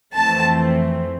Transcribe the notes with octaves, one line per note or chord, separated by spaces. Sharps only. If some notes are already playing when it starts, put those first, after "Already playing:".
F2 E3 A3 C4 A5